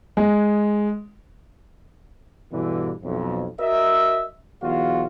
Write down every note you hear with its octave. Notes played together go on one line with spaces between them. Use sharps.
G#3
G2 B2 D3 E3
B1 F2
F#4 A#4 D#5 E5
B1 E2 F4 F#4 F5